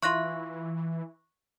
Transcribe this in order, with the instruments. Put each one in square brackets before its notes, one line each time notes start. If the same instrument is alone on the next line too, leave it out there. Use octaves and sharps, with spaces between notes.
[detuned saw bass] E3 [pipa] E4 F4 [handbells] C#6 F#6 A#6